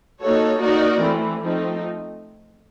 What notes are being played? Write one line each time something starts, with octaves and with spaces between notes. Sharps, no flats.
A#3 D#4 F#4 A4 C#5
A#3 D#4 F#4 A#4 D5
E3 A3 C4
F3 A3 C4 D#4